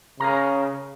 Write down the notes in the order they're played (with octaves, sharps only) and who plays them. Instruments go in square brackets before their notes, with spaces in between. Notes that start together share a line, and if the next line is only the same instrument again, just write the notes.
[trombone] C#3 [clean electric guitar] G#4 A#4 A#5